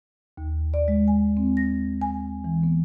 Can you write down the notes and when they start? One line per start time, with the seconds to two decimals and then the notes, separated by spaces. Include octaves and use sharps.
0.37 D#2
0.74 D5
0.88 G#3
1.08 G#5
1.37 C4
1.57 A#6
2.01 G#5
2.44 E3
2.63 B3